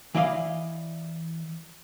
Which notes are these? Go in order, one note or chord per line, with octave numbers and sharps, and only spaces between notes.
E3 E4 D5 D#5 F5